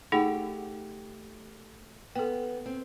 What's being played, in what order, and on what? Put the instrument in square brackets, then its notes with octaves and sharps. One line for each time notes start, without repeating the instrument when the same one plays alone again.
[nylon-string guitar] A3 G4 [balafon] D#4 G#4 F#5
[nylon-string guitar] B3 [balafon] A4 G5
[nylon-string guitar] C4